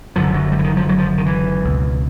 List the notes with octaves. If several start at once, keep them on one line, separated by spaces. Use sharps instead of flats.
F#1 F#2 D3 F3
F#3
G3
E3
D#3
F3
F#3
F3
D#3
E3
C#2 B2